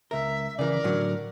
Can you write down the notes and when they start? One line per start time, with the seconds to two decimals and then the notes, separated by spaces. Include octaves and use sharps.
0.11 C#2 A#4 E5
0.59 C#3 E3 A#4 D5
0.84 A2 D3 F#3